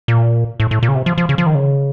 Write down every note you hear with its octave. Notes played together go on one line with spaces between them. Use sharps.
A#2
A2
A2
A#2
C#3
C3
F3
F3
C#3
F3
D#3
C#3